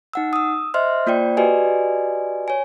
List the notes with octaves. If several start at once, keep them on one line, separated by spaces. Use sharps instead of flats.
D#4 F#5 E6
D#6 E6
C5 D#5 E5 C6 F6
A#3 F4 C5 D5 G5
F#4 G4 B4 D5 D#5 G#5
C#5 G#5